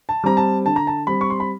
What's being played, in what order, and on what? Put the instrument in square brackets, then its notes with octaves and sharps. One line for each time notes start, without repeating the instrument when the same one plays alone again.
[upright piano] A5
G3 C4 A#5
A5
D3 A5
A#5
A5
G3 C4 B5
C#6
C6
B5